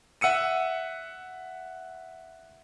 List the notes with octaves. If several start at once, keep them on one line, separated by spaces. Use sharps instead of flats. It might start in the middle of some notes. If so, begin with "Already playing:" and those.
E5 F#5 E6 C#7 D#7